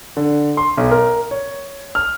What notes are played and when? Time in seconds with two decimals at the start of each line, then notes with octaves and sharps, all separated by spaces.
0.17 D3
0.57 C6
0.77 B1
0.91 A#4
1.31 C#5
1.95 F6